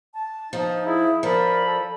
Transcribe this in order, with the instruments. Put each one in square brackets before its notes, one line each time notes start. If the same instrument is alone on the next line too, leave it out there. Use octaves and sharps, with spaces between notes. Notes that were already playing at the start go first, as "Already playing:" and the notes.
[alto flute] A5
[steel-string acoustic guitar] F3 [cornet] D#4
[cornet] E4 [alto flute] G#4
[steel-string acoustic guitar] F3 [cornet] A#4 [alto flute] D5 [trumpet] B5
[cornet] A4